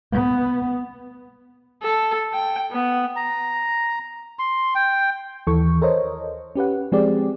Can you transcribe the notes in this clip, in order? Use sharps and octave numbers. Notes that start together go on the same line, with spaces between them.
B3
A4
G5
B3
A#5
C6
G5
D#2 E3 A4 C#6
A4 A#4 C5 C#5 D#5
C#4 G4 B4 F#5
F3 G#3 C4 G4 G#4 D5